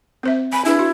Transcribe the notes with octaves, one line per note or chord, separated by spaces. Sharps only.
C4 C5 E5
G#5 B5
D4 E4 G#4 B4
F#4